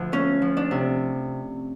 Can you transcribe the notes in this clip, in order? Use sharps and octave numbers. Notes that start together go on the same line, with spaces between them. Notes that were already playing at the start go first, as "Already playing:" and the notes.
Already playing: D2 F3
A3 C#4
F3
D4
C3